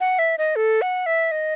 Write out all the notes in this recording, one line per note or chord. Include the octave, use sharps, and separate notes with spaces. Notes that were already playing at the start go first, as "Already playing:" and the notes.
F#5
E5
D#5
A4
F#5
E5
D#5